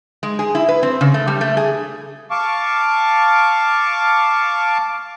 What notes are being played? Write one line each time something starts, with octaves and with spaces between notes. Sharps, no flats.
G#3
G#4
E4
B4
C4
C#3
A3
G3
A3
G#4
F5 A5 C#6 D6